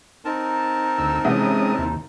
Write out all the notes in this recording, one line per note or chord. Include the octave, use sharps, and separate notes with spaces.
C4 D#4 A#4 A5
D2 E6
C3 E3 G#3 C#4 E4 D#6
D#2